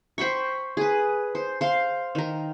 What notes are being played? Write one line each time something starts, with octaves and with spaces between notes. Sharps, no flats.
C5 G5 B5 C#6
G#4 B4
C5
C5 F5 C6
D#3 A#4